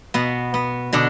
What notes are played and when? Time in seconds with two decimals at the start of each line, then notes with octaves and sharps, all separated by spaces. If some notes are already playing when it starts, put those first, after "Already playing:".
0.14 B2 B3
0.54 B3
0.93 B2 D3 D4